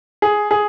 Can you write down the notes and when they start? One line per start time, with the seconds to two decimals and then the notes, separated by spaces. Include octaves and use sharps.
0.22 G#4
0.51 G#4